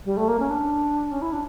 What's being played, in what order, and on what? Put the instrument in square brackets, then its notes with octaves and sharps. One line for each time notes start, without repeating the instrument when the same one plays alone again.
[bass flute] G3
A3
A#3
C#4
D4
C#4
E4
D4